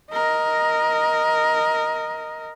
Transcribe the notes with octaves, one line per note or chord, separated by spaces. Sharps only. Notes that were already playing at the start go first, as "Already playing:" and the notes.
A#4 D#5